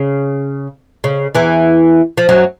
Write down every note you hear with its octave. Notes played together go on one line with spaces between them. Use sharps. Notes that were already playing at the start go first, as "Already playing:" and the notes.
Already playing: C#3
C#3
E2 E3
F3
F#2 F#3